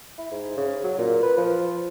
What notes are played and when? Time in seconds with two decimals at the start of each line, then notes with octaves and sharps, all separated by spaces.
0.18 E4
0.31 G#2
0.57 C#3
0.84 F#3
0.99 A#2
1.23 B4
1.37 F3